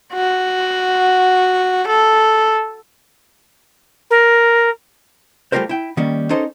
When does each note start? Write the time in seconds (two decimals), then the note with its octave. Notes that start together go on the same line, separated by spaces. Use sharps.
0.14 F#4
1.87 A4
4.11 A#4
5.52 G3 A3 F4 G4 A#4 C5
5.69 E4 G5
5.97 D#3 G3 A#3 C#4
6.30 C#4 D#4 A4 A#4 C5 D#5